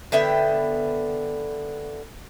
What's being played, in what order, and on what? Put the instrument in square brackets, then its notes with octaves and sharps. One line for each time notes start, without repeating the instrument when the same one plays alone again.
[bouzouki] D3 B3 E5 G5